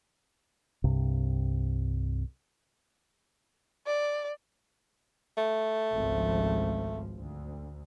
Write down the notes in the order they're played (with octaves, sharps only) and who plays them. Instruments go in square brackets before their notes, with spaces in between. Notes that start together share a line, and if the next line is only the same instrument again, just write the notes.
[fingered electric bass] C2 G2 C3
[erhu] D5
[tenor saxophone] A3
[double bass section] G#1 C#2 F3
D2